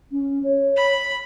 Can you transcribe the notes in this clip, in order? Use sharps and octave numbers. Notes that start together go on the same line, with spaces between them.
C#4
C#5
B5